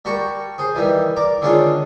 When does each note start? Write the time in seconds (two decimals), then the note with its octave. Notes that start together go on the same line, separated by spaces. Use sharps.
0.05 G3 F#4 A#4 A5 C#6
0.58 G#4 C5
0.75 D#3 E3 G3
1.16 A#4 D5 D6
1.42 D3 D#3 G#3 C#4 D4 F4